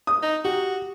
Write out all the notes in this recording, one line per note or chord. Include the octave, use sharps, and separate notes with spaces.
D#6
D#4
F#4 G4